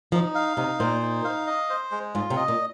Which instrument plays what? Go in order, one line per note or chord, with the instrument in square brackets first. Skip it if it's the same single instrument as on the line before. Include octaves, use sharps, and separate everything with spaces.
[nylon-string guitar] F3 [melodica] D#4
[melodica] F5
[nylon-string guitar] C3 [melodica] D#4
[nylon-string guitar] A#2 [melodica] C5
[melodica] D#4
F5
D#5
C5
G#3
[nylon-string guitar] G#2 [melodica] F4
[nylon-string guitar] C3
[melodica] D#5
[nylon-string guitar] A#2